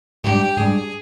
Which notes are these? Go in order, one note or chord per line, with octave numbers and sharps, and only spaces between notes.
G#2 G3 D4 G4
G#2 G3 D4 G#4